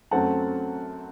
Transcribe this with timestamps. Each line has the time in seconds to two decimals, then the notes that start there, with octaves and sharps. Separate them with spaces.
0.11 F#2 F#3 A3 C4 F#5 A5